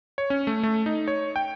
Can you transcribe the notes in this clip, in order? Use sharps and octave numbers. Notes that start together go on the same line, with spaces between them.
C#5
C#4
A3
A3
D#4
C#5
G5